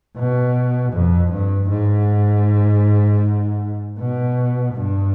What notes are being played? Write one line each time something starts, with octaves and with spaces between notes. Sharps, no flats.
B2
F2
G2
G#2
B2
G2